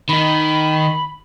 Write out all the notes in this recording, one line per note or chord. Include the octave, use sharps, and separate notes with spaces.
D#3 D#4 B5